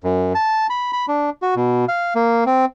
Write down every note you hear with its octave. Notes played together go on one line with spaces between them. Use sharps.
F#2
A5
B5
B5
D4
F#4
B2
F5
A#3
C4